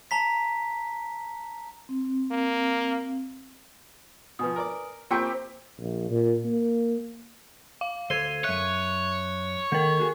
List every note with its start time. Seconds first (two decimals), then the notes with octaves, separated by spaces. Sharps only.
0.11 A5 A#5 B6
1.89 C4
2.32 A#3
4.39 B2 F3 B4 G#5 D#6
4.56 A#4 D5 D6
5.11 A#3 C4 F4 G4 C5 G5 C#6 C#7
5.79 A#1
6.11 A#2
6.45 A#3
7.81 F5
8.10 D2 A4 C5 G#6 D#7 G7
8.44 F#2 C#5 E5 F#6
9.72 D#3 A#3 A4 A#4
9.99 F#4 G#4